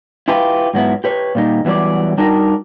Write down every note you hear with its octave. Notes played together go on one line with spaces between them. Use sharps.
E4 F4 G4 B4
G#2 F#3 B3 E4
G4 B4 C#5
A#2 G3 D#4
E2 E3 F#3 G3 D5
G3 D4 D#4 F#4 A#4